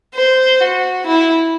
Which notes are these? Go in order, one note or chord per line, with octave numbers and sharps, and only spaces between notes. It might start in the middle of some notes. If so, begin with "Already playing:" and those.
C5
F#4
E4